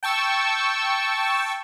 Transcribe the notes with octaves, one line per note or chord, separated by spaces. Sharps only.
G5 A5 C#6 E6